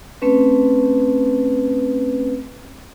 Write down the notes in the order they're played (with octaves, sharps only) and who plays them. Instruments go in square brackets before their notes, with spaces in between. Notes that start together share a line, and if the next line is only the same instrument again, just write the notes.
[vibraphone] A3 C4 C#4 B4